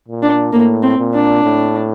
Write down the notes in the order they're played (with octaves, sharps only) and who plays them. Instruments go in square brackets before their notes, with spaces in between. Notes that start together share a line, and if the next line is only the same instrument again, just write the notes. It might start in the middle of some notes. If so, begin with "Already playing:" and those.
[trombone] A#2
[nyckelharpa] D4
[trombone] A2 [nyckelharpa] A#3
[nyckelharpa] C4
[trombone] A#2
[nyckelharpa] D4
[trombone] A2